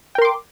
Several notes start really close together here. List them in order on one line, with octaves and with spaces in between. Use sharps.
G5 A#4 C6 D6